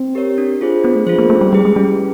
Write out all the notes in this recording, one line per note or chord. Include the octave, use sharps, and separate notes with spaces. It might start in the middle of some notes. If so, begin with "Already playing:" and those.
Already playing: C4
G4 A#4 C#5
D4
F4 G#4 C5
B3 D4
A3
F3 F4 G#4 C5
A#3
A3 C#4
G3
G3 E4 G#4 B4
G#3
G3 C#4